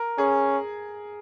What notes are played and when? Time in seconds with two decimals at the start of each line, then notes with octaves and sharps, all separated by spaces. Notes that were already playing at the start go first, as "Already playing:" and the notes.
Already playing: A#4
0.18 C#4 G#4